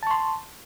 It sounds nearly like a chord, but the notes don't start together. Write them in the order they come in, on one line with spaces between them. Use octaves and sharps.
A5 C#6 C6